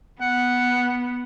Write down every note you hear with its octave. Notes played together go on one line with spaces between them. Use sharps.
B3 F#5